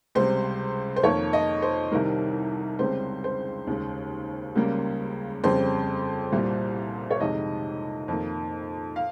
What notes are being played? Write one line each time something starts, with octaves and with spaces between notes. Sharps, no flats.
C#2 C3 G3 C5
C5
F2 D#3 A#3 C#5
D#5
C5
C2 C3 D#3 G3 A#4
C#2 C#3 G3 C4 C5
C5
D#2 C#3 G#3
C#2 C#3 G3 A#3
F2 C#3 G3 C4 C5
C2 A#2 G3
C#5
F2 C3 D#3 G#3 D#5
F2 D#3 A#3
F5